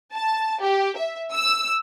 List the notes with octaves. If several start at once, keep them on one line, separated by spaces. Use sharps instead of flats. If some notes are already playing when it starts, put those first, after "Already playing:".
A5
G4
E5
E6